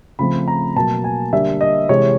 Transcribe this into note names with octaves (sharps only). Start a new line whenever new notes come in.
C#3 F3 A3 C4 B5
A#5
B2 F#3 A#3 A5
G#5
D3 G3 A#3 E5
D#5
C3 E3 G#3 C#5